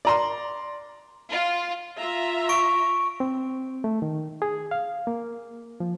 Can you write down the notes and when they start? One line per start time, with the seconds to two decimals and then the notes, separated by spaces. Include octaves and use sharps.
0.05 D5 A#5 C6
1.31 F4
1.98 F4 E5 A#5
2.49 C#6 D7
3.20 C4
3.84 A3
4.02 D#3
4.42 G#4
4.71 F5
5.07 A#3
5.80 F3